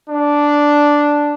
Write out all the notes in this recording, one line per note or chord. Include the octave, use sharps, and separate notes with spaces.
D4